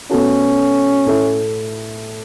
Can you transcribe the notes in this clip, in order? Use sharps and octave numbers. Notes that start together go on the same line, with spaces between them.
B2 A3 C#4 F#4 A4
A2 A3 E4 A4